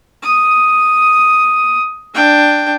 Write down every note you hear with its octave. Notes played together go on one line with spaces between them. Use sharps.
D#6
D4 G5